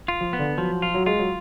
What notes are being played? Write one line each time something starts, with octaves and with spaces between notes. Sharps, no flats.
F4
F3
B3
D3
F3 F#3
F4
F#3
G#3 F4
F#3